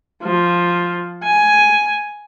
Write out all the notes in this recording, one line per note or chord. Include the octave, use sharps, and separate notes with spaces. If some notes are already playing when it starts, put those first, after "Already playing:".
F3
G#5